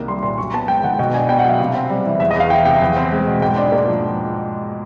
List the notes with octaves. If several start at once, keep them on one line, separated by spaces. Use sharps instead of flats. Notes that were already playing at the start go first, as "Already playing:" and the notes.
Already playing: C2 D#3 A#3
G3 C6
A#2 C6
F#2 C#6
B3 A5
G#3 G5
D#3 F#5
B2 G5
D4 G#5
B3 G5
F#5
F#3 F5
C3
C4
G3
E3
E2 E5
D#5
E2 F5
E3 G5
C3 G5
E2
C4
G#3
B2
G#2 G5
D4
A#3
F3